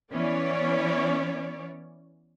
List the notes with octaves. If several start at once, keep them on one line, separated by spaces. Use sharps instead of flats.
E3 B3 C#4 C#5 D5